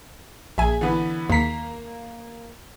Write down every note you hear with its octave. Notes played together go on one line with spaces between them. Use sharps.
A#1 G#4 E5 G#5
D3 E3 B3
D#2 A#3 A#5 B6 C7